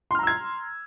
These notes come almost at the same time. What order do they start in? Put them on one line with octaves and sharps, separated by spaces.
C6 F6 A#5 E6 G#6